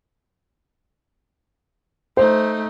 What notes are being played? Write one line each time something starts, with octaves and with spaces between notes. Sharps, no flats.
A3 D#4 C5